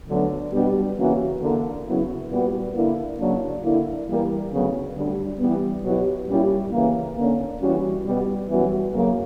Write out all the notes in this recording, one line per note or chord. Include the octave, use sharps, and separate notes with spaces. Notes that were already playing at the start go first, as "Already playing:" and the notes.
D2 D3 F#3 B3 D4
B2 G3 B3 D4 G4
C#3 E3 A#3 C#4 F#4
E2 D3 A#3
C#3 F#3 B3 E4
A#2 G3 B3 F#4
D3 A#3 E4
C#3 F#3 A#3 D4
D3 A#3 E4
E3 G3 A#3
D2 C#3 F#3 B3
D2 D3 G3
E3 G3 B3
B2 F#3 B3 E4 G4
A#2 G3 C#4 E4 G4
C#3 E3 A#3
D3 A#3 C#4
E3 G3 C#4 F#4
B2 G3 B3
F#2 E3 G3 B3 F#4
F#2 C#3 F#3 A#3